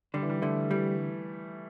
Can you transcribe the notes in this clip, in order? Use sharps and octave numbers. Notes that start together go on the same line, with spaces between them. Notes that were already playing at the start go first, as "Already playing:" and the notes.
D3 G3
E3
G3
D3 A3
E3 G3